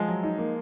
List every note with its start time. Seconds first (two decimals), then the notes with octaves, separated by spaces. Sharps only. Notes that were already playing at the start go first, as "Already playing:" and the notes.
Already playing: F3 G#3
0.09 F#3
0.23 D#4
0.38 A#3